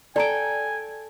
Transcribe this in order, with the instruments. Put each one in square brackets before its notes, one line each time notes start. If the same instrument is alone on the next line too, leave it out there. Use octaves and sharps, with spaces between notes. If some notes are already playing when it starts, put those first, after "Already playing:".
[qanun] A4 G5 [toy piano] D5 A#5 [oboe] G#5